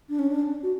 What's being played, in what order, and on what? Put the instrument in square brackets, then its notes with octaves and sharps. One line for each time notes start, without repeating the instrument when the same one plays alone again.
[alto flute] D4
C#4
D4
F#4